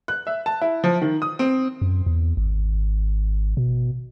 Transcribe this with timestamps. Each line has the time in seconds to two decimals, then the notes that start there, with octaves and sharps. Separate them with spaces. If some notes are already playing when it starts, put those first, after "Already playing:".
0.08 F#6
0.27 E5
0.46 A5
0.61 E4
0.84 F3
1.02 D#3
1.22 D#6
1.39 C4
1.82 F#2
2.06 E2
2.37 G#1
3.57 B2